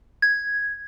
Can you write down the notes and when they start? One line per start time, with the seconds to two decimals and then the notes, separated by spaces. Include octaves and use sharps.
0.22 G#6